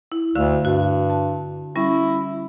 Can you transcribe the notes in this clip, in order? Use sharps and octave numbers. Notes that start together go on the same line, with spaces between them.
E4
D2 D3 F5 E6
G2 F#4
A5
G3 C#4 E4